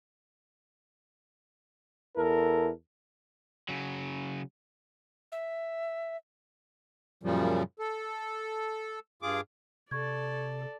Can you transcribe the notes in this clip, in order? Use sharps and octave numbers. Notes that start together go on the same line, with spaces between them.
E2 E4 A4 A#4
C#3 F#3
E5
F#2 A#2 C#3 F3 G3
A4
G2 F4 G#4 D6
C3 A4 D5 C#6 G#6